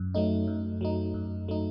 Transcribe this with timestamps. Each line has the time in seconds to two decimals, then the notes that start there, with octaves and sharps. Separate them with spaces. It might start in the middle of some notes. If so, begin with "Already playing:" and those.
Already playing: F#2
0.15 F#3 A3 D#4
0.47 F#2
0.81 F#3 A3 D#4
1.14 F#2
1.48 F#3 A3 D#4